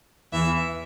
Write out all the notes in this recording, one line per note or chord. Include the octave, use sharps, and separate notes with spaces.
E2 E3 E5